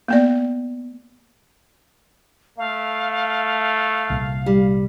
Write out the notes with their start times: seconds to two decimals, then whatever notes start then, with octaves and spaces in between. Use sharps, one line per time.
0.08 A#3 B3 D5
2.58 A3 F5
4.10 C2 A#2
4.46 G3